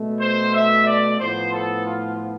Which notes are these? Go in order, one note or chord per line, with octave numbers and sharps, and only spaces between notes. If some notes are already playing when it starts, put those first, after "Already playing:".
Already playing: B2 A3
C5
E5
D5
A2 F3 B3 C5
A4
F4